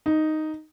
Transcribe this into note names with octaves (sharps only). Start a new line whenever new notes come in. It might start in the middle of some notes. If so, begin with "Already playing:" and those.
D#4